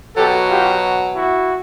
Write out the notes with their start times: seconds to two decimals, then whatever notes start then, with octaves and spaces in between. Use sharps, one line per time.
0.16 B2 F#3 G4 A4
0.49 F4 G4
1.15 E4 F#4